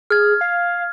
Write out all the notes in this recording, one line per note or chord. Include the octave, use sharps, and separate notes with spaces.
G#4 F6 G#6
F5